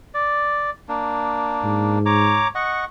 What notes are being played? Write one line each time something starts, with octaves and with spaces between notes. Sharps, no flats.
D5
A#3 D4
G#2
C#5 A#5 D6
D#5 F#5 C#6